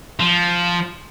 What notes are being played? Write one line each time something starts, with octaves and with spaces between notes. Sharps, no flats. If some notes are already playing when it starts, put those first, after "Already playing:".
F3